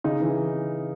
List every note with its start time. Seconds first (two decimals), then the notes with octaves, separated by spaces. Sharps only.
0.04 C#3 D#4
0.22 E3